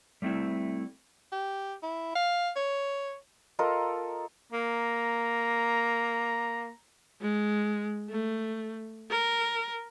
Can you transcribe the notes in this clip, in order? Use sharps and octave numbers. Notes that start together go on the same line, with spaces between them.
G3 A3 C4 D#4 E4
G4
E4
F5
C#5
F4 A4 A#4 D#5
A#3 A#5
G#3
A3
A#4